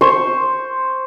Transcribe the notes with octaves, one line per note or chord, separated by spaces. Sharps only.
C5 C#6